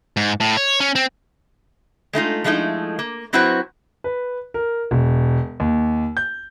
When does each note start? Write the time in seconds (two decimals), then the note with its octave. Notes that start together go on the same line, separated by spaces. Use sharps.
0.17 G#2
0.40 A2
0.57 C#5
0.80 C#4
0.95 C4
2.13 G#3 A3 D#4 F4
2.44 F3 G#3 A3 D#4 E4
2.99 A#3
3.33 F#3 C4 E4 F#4 B4 C5
4.04 B4
4.54 A#4
4.91 E1
5.60 D#2
6.17 G6